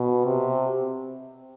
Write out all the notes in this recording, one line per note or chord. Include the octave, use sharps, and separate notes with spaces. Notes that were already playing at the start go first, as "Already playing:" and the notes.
Already playing: B2
C3